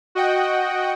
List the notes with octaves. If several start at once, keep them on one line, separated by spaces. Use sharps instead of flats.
F#4 D#5 F#5 G5